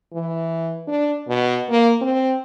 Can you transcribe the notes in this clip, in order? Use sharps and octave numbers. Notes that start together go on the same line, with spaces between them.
E3
D4
B2
A#3
C4